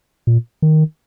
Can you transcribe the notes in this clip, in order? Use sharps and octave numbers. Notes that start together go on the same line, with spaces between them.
A#2
D#3